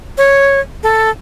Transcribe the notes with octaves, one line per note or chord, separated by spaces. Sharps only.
C#5
A4